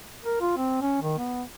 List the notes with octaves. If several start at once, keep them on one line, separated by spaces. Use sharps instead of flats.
A#4
F4
C4
C#4
D#3
B3